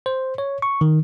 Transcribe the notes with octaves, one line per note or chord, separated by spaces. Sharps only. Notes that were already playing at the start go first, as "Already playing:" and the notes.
C5
C#5
C#6
D#3